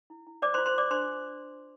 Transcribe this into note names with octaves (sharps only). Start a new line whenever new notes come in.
E4
E4
C5 D5 D6
C5 C6
F4
C5 C6
F4 D5 D6
D4 C5 C6